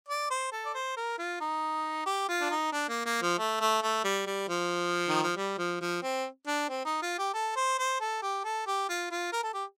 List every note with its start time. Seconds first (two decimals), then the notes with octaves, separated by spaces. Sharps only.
0.08 D5
0.31 C5
0.52 A4
0.65 D5
0.74 C5
0.96 A#4
1.18 F4
1.40 D#4
2.06 G4
2.29 F4
2.41 D4
2.50 D#4
2.73 D4
2.89 A#3
3.05 A#3
3.22 F3
3.38 A3
3.60 A3
3.82 A3
4.04 G3
4.26 G3
4.48 F3
5.08 D#3
5.23 F3
5.36 G3
5.58 F3
5.81 F3
6.02 C4
6.47 D4
6.69 C4
6.85 D#4
7.02 F4
7.18 G4
7.34 A4
7.56 C5
7.79 C5
8.00 A4
8.22 G4
8.44 A4
8.66 G4
8.89 F4
9.11 F4
9.32 A#4
9.43 A4
9.54 G4